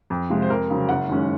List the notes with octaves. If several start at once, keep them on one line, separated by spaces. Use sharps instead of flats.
F2
C3 F3 G#3
C5
F2 A#4
C#3 F#3 C4
F#1 F#5
F#2 D#3 G#3 C#4